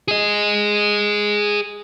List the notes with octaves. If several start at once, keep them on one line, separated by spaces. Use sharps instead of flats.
G#4 D#5